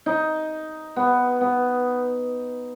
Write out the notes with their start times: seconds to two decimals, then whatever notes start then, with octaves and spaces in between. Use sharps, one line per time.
0.06 D#4
0.96 B3
1.41 B3